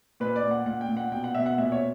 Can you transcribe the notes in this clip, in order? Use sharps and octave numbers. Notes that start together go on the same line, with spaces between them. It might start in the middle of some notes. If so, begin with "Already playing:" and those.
A#2 B4
D5
A#2
F#5
A#2 F#5
G5
A#2
F#5
B2 G5
F#5
B2 E5
F#5
A#2 E5
C#5